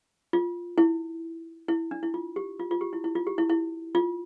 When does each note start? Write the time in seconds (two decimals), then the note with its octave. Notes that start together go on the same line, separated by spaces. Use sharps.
0.33 F4
0.78 E4
1.68 E4
1.91 D4
2.03 E4
2.14 F4
2.36 G4
2.60 F4
2.71 F4
2.81 G4
2.93 E4
3.04 E4
3.15 F4
3.27 G4
3.38 E4
3.49 E4
3.95 F4